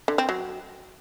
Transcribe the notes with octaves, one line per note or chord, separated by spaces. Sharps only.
D3
C4
F#3